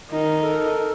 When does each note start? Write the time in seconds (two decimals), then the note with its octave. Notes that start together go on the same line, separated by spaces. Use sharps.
0.10 D#3 D#4
0.43 A4 A#4